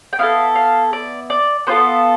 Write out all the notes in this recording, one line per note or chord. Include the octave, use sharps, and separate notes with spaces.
G5
B3 E4 A4 F5
F5
D5
D5
B3 F4 A4 C5